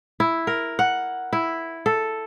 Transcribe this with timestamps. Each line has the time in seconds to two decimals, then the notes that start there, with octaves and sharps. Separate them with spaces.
0.20 E4
0.47 A#4
0.79 F#5
1.33 E4
1.86 A4